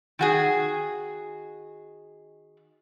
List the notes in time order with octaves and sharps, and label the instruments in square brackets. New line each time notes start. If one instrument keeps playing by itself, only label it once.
[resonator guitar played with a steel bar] D#3 F#4 G#4